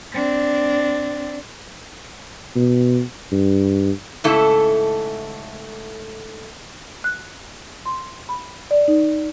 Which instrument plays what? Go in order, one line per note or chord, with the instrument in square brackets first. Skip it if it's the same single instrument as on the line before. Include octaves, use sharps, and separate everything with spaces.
[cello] C4 D4
[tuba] B2
G2
[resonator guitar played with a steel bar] G#2 C#3 A3 E4 A4
[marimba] F#6
C6
B5
D5
D#4